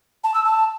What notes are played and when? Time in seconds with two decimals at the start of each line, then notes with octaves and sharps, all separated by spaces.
0.24 A5
0.34 E6
0.45 A5